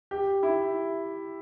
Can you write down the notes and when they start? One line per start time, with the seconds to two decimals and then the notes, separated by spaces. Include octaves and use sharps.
0.11 G4
0.43 E4